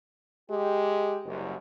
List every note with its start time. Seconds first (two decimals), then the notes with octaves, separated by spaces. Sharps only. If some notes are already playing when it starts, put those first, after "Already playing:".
0.50 G#3 G4
1.25 F#1 C2 F#2